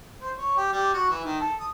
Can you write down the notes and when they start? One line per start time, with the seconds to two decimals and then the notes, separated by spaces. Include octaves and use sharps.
0.21 C5
0.36 C#5
0.57 G4
0.72 G3
0.93 F#4
1.09 E3
1.24 D#3
1.40 A4
1.60 D#6